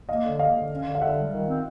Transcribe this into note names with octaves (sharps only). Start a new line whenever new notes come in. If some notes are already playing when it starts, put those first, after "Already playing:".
A#3 D#5 F5
D3
A#3 D#5 F5
D3
C#4
D3
F5
D3 E5 F#5
G3
D#3
C4